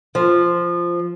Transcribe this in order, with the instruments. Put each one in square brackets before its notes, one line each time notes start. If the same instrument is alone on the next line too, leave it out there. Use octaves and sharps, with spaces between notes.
[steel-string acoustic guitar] F3